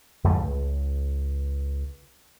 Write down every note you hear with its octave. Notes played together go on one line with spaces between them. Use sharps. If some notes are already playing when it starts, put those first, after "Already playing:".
F2 G#2 D3 A3
C#2